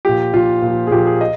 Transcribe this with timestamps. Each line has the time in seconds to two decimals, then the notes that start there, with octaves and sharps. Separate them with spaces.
0.05 F3 G4
0.09 A#2
0.34 A#2 F3 F4
0.62 A#2
0.67 F3
0.87 G#4
0.91 A#2 F3 G4
1.07 G#4
1.21 D#5